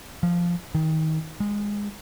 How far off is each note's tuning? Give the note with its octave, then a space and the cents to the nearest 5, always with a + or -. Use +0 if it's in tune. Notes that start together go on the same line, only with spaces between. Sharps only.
F3 -5
D#3 +25
G#3 -15